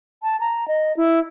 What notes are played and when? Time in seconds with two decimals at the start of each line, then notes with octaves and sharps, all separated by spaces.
0.23 A5
0.40 A#5
0.68 D#5
0.97 E4